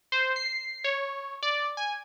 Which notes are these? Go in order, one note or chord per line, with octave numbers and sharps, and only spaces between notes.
C5
C7
C#5
D5
G#5